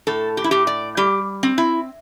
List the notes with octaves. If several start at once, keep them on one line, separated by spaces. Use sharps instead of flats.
A2 A4
G4
E4
A2 G4
D5
G3 G4
C4
E4